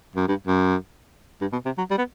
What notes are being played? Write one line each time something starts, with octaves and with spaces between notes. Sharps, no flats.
F#2
G2
F#2
G2
B2
C3
F#3
G3
B3